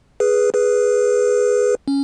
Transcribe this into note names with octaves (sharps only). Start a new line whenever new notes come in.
G#4 B4
G#4 B4
C#4